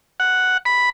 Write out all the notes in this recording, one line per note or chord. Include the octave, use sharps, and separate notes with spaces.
F#5
B5